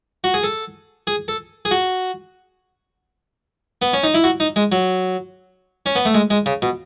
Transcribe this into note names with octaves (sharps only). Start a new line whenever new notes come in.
F#4
G#4
A4
G#4
A4
G#4
F#4
B3
C#4
D#4
E4
F#4
D#4
G#3
F#3
C#4
B3
A3
G#3
G#3
C#3
B2